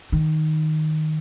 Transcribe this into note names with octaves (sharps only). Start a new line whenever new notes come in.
D#3